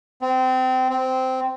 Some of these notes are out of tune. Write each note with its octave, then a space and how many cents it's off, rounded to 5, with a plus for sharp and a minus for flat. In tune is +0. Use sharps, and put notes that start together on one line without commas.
C4 -25
C4 -10